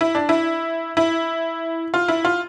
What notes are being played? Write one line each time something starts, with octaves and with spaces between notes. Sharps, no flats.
E4
D4
E4
E4
F4
E4
F4